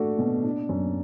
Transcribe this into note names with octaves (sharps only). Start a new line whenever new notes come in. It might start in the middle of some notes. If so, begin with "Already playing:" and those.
Already playing: A3 D4 F#4
B2
D4
F#2